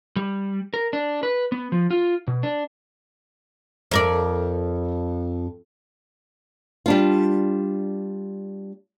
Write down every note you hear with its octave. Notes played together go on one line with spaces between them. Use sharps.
G3
A#4
D4
B4
B3
F3
F4
B2
D4
F2 A#4 D5
G3 D4 F4